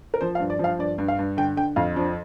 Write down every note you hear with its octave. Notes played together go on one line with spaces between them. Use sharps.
A#4
F3 C5
F5
G2
D5
F3 F5
G2 D5
G2
F5
G2
D3 G5
D3 G5
F2 F5
F3 D4